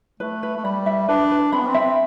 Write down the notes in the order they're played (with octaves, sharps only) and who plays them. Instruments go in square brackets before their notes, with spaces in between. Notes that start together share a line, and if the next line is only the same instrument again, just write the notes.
[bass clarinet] A3 [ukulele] B4
[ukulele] B4
[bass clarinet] A3
[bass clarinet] G3 [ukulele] B5
[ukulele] E5
[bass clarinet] D4 [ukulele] B4
[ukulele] B4
[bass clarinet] C4 [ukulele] B5
[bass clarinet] B3
C4
[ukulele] E5